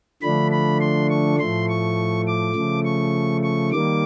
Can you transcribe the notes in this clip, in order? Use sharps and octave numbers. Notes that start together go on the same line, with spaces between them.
D3 F3 A3 D4 B5
B5
C6
C#6
A2 F3 A3 C6
C#6
D6
C#3 F3 A3
C#6
C#6
D#3 G3 A#3 D6